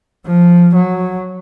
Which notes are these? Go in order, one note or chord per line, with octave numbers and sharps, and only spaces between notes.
F3
F#3